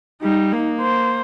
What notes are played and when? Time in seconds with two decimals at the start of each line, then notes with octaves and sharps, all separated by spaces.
0.22 G3 D#4
0.52 A#3
0.81 C5